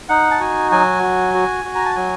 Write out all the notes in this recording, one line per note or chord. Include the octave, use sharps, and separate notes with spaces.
D#4 F#5
A5
F#4 G#5
F#3 G#5
F#4
F#4
F#4
A#5
A5
F#3 G#5